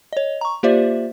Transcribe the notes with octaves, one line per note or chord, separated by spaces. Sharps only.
C#5 D#5
A#5 C#6
A#3 F4 G4 C5 D5 E5